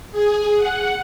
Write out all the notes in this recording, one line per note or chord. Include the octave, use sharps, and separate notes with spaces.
G#4
F#5